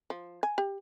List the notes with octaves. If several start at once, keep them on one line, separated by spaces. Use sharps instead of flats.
F3
G#5
G4